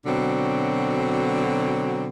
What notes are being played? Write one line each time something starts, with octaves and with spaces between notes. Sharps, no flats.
B2 D3 F#3 C4